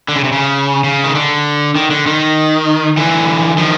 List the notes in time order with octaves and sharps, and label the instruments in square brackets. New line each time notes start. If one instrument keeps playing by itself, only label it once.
[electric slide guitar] D3
C#3
C3
C#3
C#3
D#3
D3
D#3
D3
D#3
D3 E3
D#3 F3